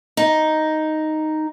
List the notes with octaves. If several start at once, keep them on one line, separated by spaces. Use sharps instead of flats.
D#4